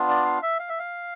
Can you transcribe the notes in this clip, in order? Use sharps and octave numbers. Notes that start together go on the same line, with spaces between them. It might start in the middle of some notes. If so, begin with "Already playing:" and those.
Already playing: B3 D4 F4
D5
F5
E5
F5
E5
F5